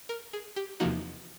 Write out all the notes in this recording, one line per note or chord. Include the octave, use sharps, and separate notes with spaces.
A#4
G#4
G4
E2 C3 F3 A#3 D#4 F#4